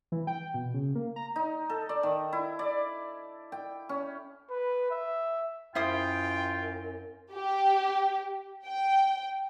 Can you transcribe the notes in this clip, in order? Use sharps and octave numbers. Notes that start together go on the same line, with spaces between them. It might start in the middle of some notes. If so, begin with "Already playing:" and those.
E3
G5
B2
C#3
A#3
A#5
D#4
A4
D5
D#3
E4
D5
G5
C#4
B4
E5
F#2 E4 F4 C5 G5 D#6
G4
G5